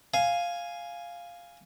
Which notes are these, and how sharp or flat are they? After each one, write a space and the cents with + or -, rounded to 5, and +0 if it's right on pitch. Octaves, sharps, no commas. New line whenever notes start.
F5 +0 G#5 +0